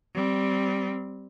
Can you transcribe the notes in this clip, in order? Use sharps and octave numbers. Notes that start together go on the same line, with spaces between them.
G3 C4